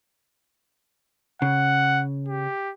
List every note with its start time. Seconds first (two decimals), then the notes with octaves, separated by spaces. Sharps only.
1.42 C#3 F#5
2.28 G4